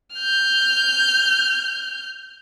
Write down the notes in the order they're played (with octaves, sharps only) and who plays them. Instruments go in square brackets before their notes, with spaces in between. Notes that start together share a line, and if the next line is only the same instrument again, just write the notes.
[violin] F6 G6